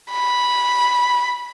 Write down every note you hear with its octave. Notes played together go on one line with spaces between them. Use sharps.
B5